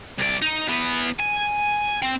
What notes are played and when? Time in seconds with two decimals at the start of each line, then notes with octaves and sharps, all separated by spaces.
0.19 C2 D5
0.42 D#4
0.68 E3 B3
1.19 G#5
2.02 C4 G5